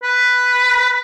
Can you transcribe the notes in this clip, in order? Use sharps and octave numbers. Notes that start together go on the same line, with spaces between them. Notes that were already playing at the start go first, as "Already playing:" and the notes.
B4